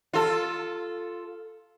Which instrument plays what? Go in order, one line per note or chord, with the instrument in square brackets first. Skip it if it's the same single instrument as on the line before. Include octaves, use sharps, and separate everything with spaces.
[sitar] F4 A4